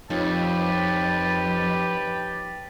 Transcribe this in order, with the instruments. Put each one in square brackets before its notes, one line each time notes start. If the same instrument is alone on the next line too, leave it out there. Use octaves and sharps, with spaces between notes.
[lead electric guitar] F2 [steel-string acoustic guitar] F3 D#4 C#5 [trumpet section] G4 B4 [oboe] A5